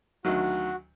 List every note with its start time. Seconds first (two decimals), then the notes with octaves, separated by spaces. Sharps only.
0.25 D2 D#3 F#3 F#4